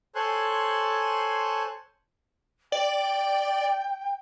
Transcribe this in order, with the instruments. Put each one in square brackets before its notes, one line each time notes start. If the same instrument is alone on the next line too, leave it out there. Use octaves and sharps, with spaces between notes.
[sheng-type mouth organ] A4 C5 C#5 G#5 C6 F#6
[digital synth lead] D5 [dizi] G5